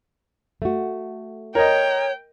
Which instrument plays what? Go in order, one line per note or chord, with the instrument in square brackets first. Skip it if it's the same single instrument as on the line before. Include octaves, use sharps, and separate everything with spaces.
[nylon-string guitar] A3 F#4
[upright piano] A#4 D#5 [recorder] C#5 [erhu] G5